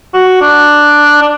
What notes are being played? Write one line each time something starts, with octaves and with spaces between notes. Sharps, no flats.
F#4
D4
D4